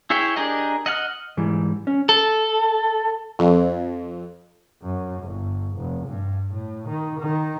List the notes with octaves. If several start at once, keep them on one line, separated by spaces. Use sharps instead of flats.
E4 G#4 C#5 E5 G5
D4 G4 G#4 A#4 D#5
D#5 F#5 G#5 F6
G#2 E3 G3
C#4
A4
F2
F#2
G1
F1
G2
A2
D#3
D#3